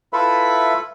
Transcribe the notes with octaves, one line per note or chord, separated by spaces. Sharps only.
E4 F4 A4 B4 E5 B5